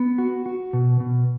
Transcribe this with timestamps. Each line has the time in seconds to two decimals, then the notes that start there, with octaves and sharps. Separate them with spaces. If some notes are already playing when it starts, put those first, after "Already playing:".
Already playing: B3
0.18 F#4
0.46 F#4
0.73 B2
1.00 B2